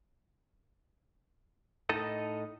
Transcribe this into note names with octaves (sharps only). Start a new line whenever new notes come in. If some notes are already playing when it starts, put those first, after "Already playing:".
A2 D#4 A4 D#5